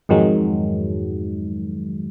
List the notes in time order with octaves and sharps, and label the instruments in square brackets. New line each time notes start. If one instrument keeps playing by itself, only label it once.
[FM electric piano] F2 G#2 D#3 F#3 G#3